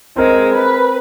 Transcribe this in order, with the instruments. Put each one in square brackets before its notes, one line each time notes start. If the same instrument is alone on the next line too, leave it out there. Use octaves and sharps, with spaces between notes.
[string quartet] G#3 [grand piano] C4 A#4
[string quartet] B4